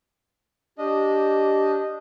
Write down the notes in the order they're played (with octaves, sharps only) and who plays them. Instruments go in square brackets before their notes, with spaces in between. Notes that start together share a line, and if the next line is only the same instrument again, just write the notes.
[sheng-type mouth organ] D4 D#5 [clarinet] G4